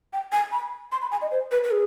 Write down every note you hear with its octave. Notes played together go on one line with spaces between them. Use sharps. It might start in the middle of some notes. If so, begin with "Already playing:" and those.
G5
G#5
B5
C6
B5
G#5
D#5
C5
B4
B4
G#4